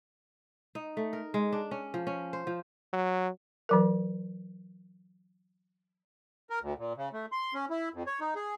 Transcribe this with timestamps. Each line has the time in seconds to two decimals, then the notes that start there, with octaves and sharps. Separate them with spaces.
0.75 D#4
0.97 A3
1.13 A#4
1.34 G#3
1.52 D4
1.71 C#4
1.94 F3
2.07 C#4
2.33 C5
2.47 F3
2.93 F#3
3.69 E3 F#3 A#4
6.50 A#4
6.62 D2
6.78 A#2
6.97 C#3
7.13 A3
7.32 C6
7.54 C#4
7.70 E4
7.94 F2
8.07 C#5
8.21 D#4
8.35 G#4